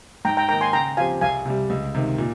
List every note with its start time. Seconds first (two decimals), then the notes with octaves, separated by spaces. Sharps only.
0.25 G#2 G5 A#5
0.37 G5 A#5
0.49 D#3 A#3 D#4 A#4 G5 A#5
0.61 G#5 C6
0.73 C#3 G5 A#5
0.97 F3 C4 G4 F5 G#5
1.21 C2 F5 G#5
1.45 C3 G3
1.70 C#2
1.95 C3 D#3
2.18 A#2